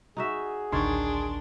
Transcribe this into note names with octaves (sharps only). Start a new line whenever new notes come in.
D#4 F#4 G#4 E5
A1 D2 D#3 D4 C#5 D5 C6